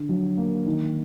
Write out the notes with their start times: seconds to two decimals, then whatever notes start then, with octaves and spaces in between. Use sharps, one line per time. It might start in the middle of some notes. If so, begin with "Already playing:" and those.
Already playing: D3
0.09 F#3
0.37 A#3
0.66 D#3